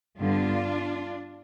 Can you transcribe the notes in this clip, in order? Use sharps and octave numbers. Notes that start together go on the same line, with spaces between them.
G2 D3 G3 B3 D4 F4